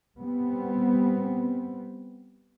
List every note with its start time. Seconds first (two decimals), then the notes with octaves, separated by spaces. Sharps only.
0.20 G3 B3 C4